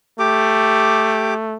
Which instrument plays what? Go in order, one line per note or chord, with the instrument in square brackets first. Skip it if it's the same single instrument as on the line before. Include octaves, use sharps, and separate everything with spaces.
[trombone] A3 [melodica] G4 D6